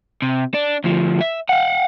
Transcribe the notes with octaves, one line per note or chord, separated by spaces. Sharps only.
C3
D4
D2 F3
E5
F5 F#5